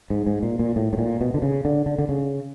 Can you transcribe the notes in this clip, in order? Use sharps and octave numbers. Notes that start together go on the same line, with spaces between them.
G#2
G#2
A#2
A#2
A2
A2
A#2
B2
D3
C#3
D3
D3
D3
C#3